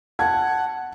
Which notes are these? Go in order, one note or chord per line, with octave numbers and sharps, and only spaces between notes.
F#5 A5 G#6